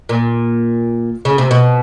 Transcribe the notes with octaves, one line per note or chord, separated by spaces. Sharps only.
A#2
C#3
C3
B2